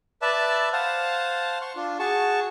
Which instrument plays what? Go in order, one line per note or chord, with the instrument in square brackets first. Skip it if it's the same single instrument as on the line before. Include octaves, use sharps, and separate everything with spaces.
[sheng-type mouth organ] B4 D5 E5 A5
C5 F5 F#5 A5
C6 C#6
D4 F4
F#4 G#4 A5 C#6